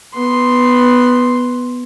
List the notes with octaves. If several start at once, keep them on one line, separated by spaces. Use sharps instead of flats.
B3 C6